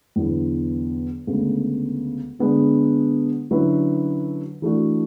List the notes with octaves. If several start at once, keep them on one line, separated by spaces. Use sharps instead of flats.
E2 D3 F#3 B3
D2 C#3 G#3 B3
D3 G#3 B3 D4
D3 F#3 C#4 E4 B4
E3 A3 D4 F#4